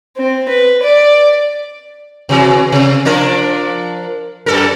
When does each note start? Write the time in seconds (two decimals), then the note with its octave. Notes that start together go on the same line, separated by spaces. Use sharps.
0.17 C4
0.49 B4
0.83 D5
2.29 C3 E3 F#3
2.72 C3
3.05 F3 D4 A#4
4.46 F#2 A4 A#4